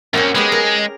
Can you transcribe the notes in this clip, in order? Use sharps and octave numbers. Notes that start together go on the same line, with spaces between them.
F#2 A#3 C4 C#4
G#3 B3 G4 G#4
A#4